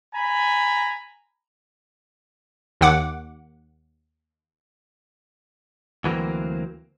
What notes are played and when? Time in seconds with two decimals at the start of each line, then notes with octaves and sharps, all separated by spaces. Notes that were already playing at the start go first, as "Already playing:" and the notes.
0.13 G#5 A#5 B5
2.81 D#2 D#3 F#5 D6
6.04 D2 E3 F#3 A#3 C4